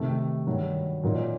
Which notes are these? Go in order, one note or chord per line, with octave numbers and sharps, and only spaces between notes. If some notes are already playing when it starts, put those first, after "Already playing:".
Already playing: C3 D#3 A3
G2 D#3 F#3
A#2 F#3 A#3 D#4